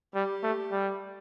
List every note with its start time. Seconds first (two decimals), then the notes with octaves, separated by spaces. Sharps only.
0.15 G3 G4
0.43 A3
0.72 G3